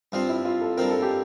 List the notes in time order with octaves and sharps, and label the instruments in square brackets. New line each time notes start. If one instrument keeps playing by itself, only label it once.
[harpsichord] G2 F3 C4 [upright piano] F4
[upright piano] E4
F4
A4
[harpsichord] G2 F3 C4 [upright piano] A#4
[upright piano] A4
G4